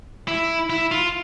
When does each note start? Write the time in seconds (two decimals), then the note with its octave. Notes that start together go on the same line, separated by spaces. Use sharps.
0.28 E4
0.70 E4
0.91 F4